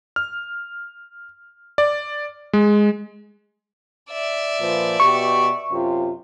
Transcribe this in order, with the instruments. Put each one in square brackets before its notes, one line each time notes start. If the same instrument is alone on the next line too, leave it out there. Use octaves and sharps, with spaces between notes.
[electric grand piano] F6
D5
G#3
[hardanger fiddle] D5 E5
[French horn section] A#2 F3 B4
[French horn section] B2 G4 [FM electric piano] C#6
[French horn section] F#2 C3 F4